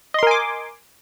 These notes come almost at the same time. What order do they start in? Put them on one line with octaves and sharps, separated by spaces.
D#5 C6 A#4 G#5 D6